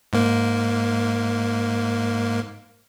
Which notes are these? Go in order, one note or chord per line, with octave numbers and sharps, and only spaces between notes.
G#2 A#3